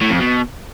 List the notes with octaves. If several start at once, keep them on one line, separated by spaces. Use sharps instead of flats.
A2
F2
B2